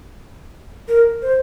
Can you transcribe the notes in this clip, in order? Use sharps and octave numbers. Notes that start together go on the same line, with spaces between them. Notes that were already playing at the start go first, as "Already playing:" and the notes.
A#4
C5